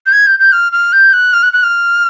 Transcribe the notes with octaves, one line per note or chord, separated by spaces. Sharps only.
G6
G#6
G6
G6
F6
F6
G6
F#6
F6
F#6
F#6
F6